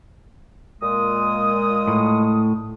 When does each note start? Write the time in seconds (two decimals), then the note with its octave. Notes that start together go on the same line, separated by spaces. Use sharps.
0.82 A#2 G#3 D#6
1.88 A2